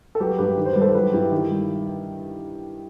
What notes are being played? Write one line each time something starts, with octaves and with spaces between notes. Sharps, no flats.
A4
F#3 G4 B4
G2 G4 B4
D#3
C5
G3 B4
A4 C5
F#3 G4 B4
G2 E4 G4
D#3
G3